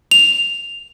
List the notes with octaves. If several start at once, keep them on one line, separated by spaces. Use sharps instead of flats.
F7